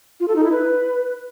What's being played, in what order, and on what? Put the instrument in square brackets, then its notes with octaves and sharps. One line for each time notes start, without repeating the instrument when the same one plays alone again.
[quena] F4
A4
D#4
E4
B4